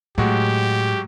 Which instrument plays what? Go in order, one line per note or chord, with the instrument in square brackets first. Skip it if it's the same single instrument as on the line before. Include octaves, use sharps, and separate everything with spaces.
[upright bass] A2 [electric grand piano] F#3 G#3 F#4 [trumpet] G4